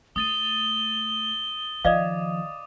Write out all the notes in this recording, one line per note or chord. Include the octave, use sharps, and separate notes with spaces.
A3 D#6 A6 D#7 G7
D#3 F3 D5 D#5 F5 D6 D#6